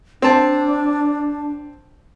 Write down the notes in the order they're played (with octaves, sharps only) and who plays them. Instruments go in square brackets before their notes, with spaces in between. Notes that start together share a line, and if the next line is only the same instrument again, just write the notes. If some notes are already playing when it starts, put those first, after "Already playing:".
[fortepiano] C4 A5 [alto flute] D4